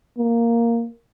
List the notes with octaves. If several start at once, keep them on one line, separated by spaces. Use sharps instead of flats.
A#3